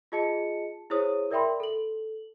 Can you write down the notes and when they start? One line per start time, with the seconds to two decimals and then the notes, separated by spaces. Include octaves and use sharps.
0.12 F4 G#4 D#5 A5 C#7
0.90 E4 G#4 C5 C#5 D#6
1.31 A#4 D5 E5 G5 B5 C6
1.60 A4 F#7